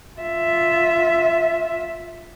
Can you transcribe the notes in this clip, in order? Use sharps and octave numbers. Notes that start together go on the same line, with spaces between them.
F4 E5